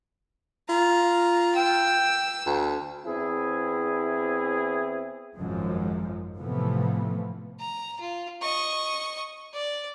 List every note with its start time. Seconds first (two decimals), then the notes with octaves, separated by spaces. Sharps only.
0.69 F4 A#5
1.56 G5 E6
2.46 D2
3.05 E2 C4 E4 G#4
5.35 G#1 F#2 F3 G#3
6.38 A2 C3 E3 F3 A3 B3
7.60 A#5
8.00 F4
8.42 D#5 C#6
9.54 D5